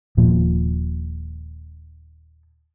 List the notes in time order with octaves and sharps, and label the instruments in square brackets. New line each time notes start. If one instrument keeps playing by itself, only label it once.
[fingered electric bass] D#1 A#2 F3